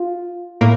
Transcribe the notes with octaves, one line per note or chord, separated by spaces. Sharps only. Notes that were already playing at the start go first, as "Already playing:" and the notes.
Already playing: F4
A2 A#3